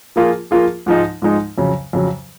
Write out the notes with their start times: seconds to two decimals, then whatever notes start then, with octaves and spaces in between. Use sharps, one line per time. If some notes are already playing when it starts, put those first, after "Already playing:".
0.16 F3 A#3 F4 G#4
0.51 F3 A#3 F4 G#4
0.86 G#2 F3 G#3 D#4
1.22 G#2 F3 G#3 D#4
1.58 F2 C#3 F#3
1.93 F2 C#3 F#3